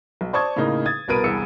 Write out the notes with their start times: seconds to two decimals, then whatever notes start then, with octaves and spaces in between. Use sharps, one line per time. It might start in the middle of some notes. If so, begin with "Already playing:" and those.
0.21 B1
0.33 C5 D5 A5 C#6 D#6 G#6
0.56 A2 C#3 A#3 D#4
0.86 D#6 G#6 A6
1.08 C2 B2 A#4 B4 D7 D#7
1.24 E1 C2 E3 B3 E6 C#7